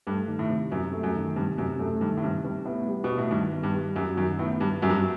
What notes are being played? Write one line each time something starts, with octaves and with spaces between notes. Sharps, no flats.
G2 A3
D#3
A2
C3
F#2 C3
A3
F#2
D#3
G2 C3
F#2 C3
F#2 A3
G2 D#3
A2
G2 C3
G2 C3
A2 B3
G3
B2
F#4
A2
G2 D#3
B3
G2
G3
F#2 F#4
F#2 D#3
A2 B3
G2 G3
F#2 F#4
G2